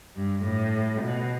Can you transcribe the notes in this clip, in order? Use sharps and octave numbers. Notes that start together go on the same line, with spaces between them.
G2
A2
B2